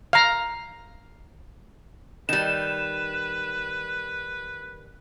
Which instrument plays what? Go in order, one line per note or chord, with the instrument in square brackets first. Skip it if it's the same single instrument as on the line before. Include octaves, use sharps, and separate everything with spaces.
[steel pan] F5 A#5
[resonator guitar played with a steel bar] D#3 G3 [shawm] B4 [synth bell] E7